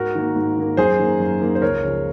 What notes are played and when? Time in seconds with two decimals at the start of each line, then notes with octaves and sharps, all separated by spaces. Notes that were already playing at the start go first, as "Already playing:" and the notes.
Already playing: G#2 F#4 A#4
0.15 D#3 A#3
0.36 G#2
0.57 D#3 A#3
0.77 F#2 G#4 C5
0.99 D#3 A#3
1.20 F#2
1.41 D#3 A#3
1.55 C5
1.62 C#2 A#4 C#5
1.84 C#3 F3